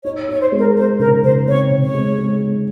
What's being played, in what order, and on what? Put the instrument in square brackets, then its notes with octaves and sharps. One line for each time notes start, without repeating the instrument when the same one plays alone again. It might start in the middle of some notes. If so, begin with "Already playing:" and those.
[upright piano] D#4 [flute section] C#5
[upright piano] D#4 [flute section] C#5
[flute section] C5
[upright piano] G#3
[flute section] A#4
[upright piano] G#3 [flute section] C5
[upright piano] C#3 [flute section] A#4
[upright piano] C#3 [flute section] C5
[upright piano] C4 [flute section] C#5
[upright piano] C#3
[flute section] C#5
[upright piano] G#3
G#3
G#3